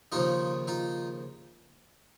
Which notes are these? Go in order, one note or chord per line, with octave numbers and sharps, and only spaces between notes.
D#2 C#3 F3 D#4 F4
D#4 F4